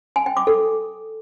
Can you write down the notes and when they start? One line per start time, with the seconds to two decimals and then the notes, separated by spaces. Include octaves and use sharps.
0.16 G#5
0.26 G5
0.37 D6
0.47 A4